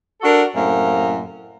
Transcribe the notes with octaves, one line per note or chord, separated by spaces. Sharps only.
D4 F#4 A4 A#4
F#2 A2 C3 A#3